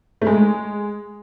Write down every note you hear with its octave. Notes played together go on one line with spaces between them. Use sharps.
A3
G#3